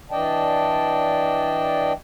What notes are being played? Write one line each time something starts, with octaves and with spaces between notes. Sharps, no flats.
E3 D4 D5 D#5 G5 A5